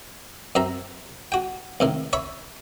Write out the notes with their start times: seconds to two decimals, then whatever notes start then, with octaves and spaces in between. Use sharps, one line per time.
0.55 F#2 C4 E5 A#5
1.32 F#4 G5
1.80 C2 A2 D#3
2.13 C#5 E5 B5 C#6